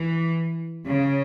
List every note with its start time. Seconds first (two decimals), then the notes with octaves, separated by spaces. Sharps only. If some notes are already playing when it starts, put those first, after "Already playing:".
Already playing: E3
0.87 C#3